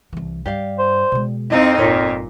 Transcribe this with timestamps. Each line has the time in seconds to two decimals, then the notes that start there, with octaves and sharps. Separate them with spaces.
0.13 C2 E3
0.46 G2 G4 D5 F5
0.79 C5
1.12 B2 G#3
1.50 F2 C4 D#4 E4 D#5 F5
1.79 G1 A#2 C#5